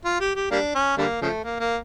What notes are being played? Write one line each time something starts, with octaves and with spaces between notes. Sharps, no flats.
F4
G4
G4
G3 A#3 D4
C#4
D3 G3 A#3
C#3 F3 A3
A#3
A#3